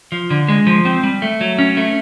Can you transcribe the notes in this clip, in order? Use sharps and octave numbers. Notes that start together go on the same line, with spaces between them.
F3
D3
G#3
F3
C4
G3
A3
F#3
C#4
A3